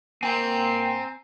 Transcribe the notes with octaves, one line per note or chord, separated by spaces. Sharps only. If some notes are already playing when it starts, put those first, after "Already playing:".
A#3 C4 G5 G#5 A#5